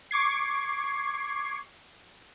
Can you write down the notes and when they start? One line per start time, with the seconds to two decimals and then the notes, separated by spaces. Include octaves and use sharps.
0.11 C#6 D6 G#6 C7